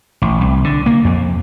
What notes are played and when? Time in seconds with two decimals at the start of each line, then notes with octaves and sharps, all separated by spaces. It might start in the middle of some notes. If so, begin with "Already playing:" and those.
0.22 A1
0.41 C2
0.64 D3
0.86 A#3
1.04 F2